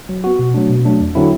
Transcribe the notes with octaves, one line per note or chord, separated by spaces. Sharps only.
F#3
B3 F#4
B2
F#3 A3 D4
B2
F#3 A3 D4
E2
D3 F#3 C4 E4